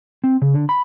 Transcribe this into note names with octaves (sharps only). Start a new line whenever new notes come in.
C4
C#3
D3
B5